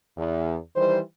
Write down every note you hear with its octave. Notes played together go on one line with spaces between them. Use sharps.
E2
D#3 E3 G3 C5